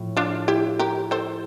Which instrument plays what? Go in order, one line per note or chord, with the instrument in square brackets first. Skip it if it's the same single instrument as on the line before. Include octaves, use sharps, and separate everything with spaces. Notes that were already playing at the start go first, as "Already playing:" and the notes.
Already playing: [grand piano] A2 F3
[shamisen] D4 F4
E4 G4
G4 A#4
A4 C5